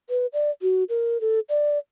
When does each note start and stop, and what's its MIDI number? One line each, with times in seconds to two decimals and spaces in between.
0.09 0.26 71
0.33 0.51 74
0.62 0.84 66
0.89 1.20 70
1.21 1.40 69
1.49 1.78 74